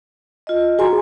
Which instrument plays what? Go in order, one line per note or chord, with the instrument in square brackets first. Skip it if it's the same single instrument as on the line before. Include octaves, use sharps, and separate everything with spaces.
[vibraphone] F4 D#5
[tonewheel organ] F#4 G#4 [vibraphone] G#5 A#5 C6